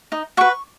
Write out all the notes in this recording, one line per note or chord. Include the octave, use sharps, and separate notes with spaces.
D#4 D#6
F#4 B4 C#6